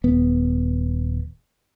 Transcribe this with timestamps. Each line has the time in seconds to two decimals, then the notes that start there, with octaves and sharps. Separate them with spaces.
0.04 D#1 B3